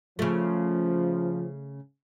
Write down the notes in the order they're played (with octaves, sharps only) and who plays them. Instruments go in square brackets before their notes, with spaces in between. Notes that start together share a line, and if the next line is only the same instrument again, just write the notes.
[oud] C#3 A3 [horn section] F3